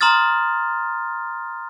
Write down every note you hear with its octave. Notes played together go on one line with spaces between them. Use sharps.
A#5 C6 D#6 F6 A6